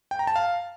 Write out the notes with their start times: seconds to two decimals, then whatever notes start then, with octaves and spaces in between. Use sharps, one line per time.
0.11 G5
0.19 A#5
0.27 A5
0.36 F5